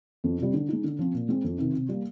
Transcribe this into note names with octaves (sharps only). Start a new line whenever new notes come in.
F2
C3 G3
D3
G#3 D#4
D3
F3 C4
A#2
G#3 C4
F2
C3 D#3
C3
G3 A#3